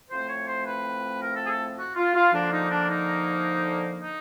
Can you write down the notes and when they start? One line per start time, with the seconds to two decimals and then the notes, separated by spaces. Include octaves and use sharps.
0.10 A2 F3 A3 C4 C5
0.28 C#5
0.47 C5
0.66 B4
1.22 A#4
1.36 A4
1.45 G#4
1.50 A4
1.78 F#4
1.96 F4
2.15 F4
2.33 D3 F3 A#3 D4
2.52 D#4
2.71 D4
2.88 D#4
4.01 D#4